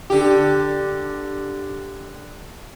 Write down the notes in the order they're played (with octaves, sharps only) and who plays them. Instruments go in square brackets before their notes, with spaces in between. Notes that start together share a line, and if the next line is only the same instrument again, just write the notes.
[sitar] D3 G4